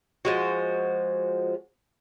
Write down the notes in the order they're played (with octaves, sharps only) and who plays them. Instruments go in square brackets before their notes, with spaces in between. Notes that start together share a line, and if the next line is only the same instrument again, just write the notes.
[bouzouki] F3 G#3 F#4